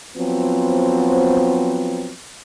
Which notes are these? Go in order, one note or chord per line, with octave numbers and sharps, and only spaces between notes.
F3 F#3 B3 C4